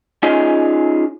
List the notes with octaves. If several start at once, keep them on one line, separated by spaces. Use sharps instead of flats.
C#4 D#4 F4 G#4 C#5 D#5